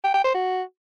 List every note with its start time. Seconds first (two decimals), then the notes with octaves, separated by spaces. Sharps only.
0.04 G5
0.14 G5
0.24 C5
0.34 F#4